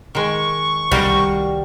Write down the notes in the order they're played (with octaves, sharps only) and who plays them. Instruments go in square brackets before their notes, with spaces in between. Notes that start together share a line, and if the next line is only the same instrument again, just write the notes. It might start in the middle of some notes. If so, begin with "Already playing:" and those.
[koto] D#3 G#3 [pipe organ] C#6
[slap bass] C2 D#3 [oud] G3 [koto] F#4 A#4 C5